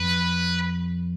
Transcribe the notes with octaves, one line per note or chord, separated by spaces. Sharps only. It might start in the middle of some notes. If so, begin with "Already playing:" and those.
Already playing: F2 B4